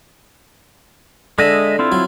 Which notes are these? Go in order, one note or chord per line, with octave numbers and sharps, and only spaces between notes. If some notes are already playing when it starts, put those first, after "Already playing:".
D3 G#3 D#5 E5
C4 E4 F4
F#3